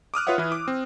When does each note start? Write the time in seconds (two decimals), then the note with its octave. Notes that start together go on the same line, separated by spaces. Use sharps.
0.14 D6 D#6 F6 F#6
0.27 F4 B4 C#5 E5 F#5
0.38 E3 E4
0.52 D6
0.68 C4